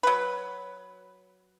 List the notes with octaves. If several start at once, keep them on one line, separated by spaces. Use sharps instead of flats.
F#3 B4